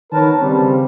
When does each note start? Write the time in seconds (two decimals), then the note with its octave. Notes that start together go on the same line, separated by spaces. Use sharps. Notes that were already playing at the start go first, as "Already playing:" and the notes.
0.12 D#3 B3 A#4 B4 C#5 A5
0.42 C#3 G3 C4